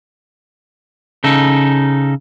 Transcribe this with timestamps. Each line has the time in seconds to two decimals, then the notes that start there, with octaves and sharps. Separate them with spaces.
1.24 C#3 D#4 A4